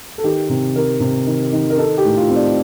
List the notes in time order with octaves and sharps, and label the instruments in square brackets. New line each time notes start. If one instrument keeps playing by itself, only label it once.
[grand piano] A4
D#3 G4
C3
D#3 A#4
C3
D#3
D#3
A#4
D#4 A4
G4
A2
F4
C4
D5